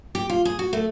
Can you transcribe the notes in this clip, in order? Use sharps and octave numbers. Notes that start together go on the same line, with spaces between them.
G4
F4
G#4
F#4
A3